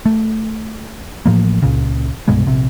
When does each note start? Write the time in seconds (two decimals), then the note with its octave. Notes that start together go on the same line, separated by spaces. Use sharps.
0.06 A3
1.26 A1 A2 F3 A#3
1.62 C#2 A#2 C#3
2.28 C2 G2 B2 G#3
2.46 A#1 C3